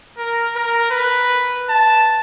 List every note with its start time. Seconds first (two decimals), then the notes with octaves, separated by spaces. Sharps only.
0.18 A#4
0.56 A#4
0.91 B4
1.69 A5